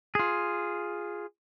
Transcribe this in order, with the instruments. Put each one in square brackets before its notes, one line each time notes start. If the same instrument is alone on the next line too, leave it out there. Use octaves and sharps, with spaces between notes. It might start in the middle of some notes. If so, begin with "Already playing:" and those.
[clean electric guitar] F4 G#4